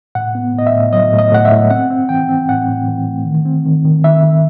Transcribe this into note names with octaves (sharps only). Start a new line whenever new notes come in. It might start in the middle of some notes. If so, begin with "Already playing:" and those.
A2 F#5
B3
A2 D#5
E5
A2
F#3 D#5
A2
D#5
A2 F#5
E5
A2
C4 F#5
C4
E3 G5
C4
A2 F#5
A2
E3
A3
D#3
C4
D#3
D#3
D#3 E5
D#3